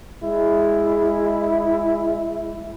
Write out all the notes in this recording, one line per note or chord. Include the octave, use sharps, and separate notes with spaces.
G#3 E4